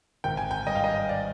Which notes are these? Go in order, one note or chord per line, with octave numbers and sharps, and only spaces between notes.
G#1 G5
G#5
G5
G2 D#5
F5
D#5
D5